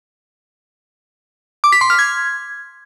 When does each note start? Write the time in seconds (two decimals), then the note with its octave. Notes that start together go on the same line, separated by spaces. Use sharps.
1.64 D6
1.72 B6
1.81 C6
1.90 F6
1.99 G#6